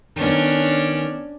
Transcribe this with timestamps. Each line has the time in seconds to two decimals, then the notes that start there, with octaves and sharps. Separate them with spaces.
0.16 D#3 B3 C#4 D4